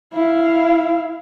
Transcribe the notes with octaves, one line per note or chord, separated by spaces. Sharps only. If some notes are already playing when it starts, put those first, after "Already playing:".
E4 F5